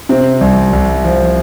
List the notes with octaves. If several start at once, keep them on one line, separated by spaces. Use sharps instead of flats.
C3 C4
C2
C2
F3